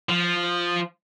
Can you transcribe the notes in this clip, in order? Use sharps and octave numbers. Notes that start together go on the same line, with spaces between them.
F3